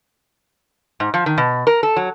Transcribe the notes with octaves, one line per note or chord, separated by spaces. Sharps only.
G#2
F3
D#3
B2
A#4
A4
F#3